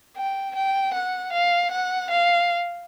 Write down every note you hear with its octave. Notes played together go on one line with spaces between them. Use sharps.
G5
G5
F#5
F5
F#5
F5